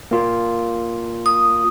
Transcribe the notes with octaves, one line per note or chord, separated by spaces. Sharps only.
A#3 F4
D#6